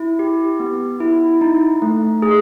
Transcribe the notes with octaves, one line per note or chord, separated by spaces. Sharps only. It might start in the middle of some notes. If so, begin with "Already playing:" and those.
Already playing: E4
G4
B3
E4
D#4
A3
G#4